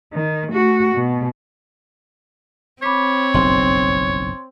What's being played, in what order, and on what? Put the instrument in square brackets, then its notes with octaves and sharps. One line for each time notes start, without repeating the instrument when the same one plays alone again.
[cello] D#3
A3 F#4
B2
[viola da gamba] C4 [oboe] C#5 [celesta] B5 D6 B6
[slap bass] F#1 B1 G2 [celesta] C6